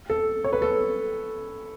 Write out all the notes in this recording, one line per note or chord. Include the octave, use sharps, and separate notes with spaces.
A4
C#5
B4
A4